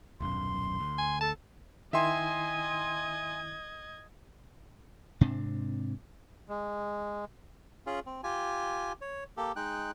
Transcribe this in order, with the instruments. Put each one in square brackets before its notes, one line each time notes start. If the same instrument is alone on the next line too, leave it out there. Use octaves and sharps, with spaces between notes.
[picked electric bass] D#1 B1 F#2 [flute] C6
[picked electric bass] D2
[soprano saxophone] G#5
[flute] A4 [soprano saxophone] A5
[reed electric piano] D#3 E4 [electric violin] D#5 G#6 [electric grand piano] E5 G5 C6 [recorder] G#5
[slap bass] G#2 C3 C4 D4
[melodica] G#3
[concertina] C#4 F4 G#4
C4
F4 G4 G#5
C#5
A#3 G4 A4
G#3 D#4 G5 F#6